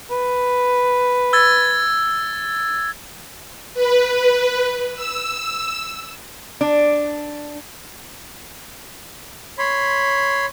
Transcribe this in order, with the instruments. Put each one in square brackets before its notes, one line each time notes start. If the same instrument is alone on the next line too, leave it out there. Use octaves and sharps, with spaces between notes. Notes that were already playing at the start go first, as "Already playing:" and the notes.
[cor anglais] B4
[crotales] E6 G#6 A6
[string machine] B4
E6
[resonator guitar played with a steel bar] D4
[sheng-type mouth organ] C#5 B5 C6